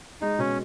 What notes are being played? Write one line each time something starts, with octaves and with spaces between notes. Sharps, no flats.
G#3 D#4
B2 C#4